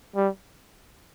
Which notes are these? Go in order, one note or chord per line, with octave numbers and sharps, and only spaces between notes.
G3